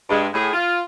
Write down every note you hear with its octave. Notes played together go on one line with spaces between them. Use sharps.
G2 G#3
A2 G#4
F4